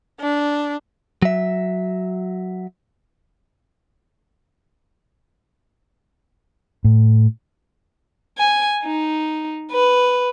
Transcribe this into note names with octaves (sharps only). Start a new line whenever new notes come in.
D4
F#3 E5
A2
G#5
D#4
B4